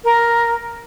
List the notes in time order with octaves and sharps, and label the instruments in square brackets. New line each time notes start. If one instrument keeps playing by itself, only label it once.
[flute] A#4